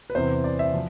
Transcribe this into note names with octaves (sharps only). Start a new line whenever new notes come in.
B4
E2 C3 E3 C5
D5
E5
F3